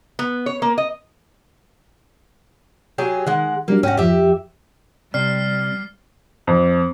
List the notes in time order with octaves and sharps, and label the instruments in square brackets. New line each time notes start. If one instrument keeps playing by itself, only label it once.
[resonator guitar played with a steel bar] B3
C#5
A#3
D#5
[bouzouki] F#3 G4 G#4
[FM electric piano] D#3 [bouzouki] G#3 F#5
[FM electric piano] F#3 G3 D4 [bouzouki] A#3
[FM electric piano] G#2 G5 A#6 [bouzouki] C#4 F#4
[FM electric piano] F2 F3 [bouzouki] G4 E5
[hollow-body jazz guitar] C3 [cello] G3 [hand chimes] D5 [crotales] F6 C7
[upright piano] F2